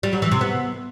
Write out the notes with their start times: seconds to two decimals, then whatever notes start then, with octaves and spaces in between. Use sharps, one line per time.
0.03 G3
0.13 F#3
0.22 E3
0.32 C3
0.41 B3